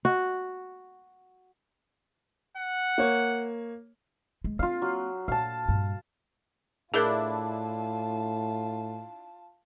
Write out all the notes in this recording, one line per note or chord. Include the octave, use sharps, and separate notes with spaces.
F#4
F#5
A#3 C#5
G#3
A#3 C4 F4 F5
F#3
A#2 F5 A5
G2 A#2
A2 D4 E4 F4 G#4 A#4 A5